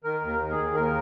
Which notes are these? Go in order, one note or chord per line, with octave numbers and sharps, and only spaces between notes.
D#3 A#4
D#2
A#4
D#3
G#4
D#2
D#2 A#4